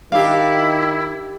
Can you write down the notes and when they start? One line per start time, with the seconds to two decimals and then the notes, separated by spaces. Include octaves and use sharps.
0.12 D#3 D4 E4 G4 F5